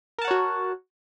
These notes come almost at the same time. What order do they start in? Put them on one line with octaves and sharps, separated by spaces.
A#4 A5 F#5 C#5 F#4